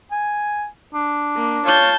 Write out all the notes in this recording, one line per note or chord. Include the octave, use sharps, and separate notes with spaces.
G#5
D4
A#3
F4 C#5 A5 G6